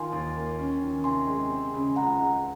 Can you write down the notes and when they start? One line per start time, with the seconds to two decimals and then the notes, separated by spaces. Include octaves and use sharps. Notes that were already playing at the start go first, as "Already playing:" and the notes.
Already playing: D#3 F4 G#5 C6
0.13 D#2
0.36 A#3
0.58 C#4
0.82 D#3
1.04 C3 G#5 C6
1.27 G#3
1.50 C4
1.74 C#3
1.96 C#2 F#5 A#5
2.19 G#3